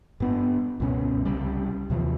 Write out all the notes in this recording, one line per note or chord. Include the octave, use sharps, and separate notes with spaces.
G2 B3 D4
C#2 G2 B2 C#4
C2 C#3 G3
D#2 C3 E3 F3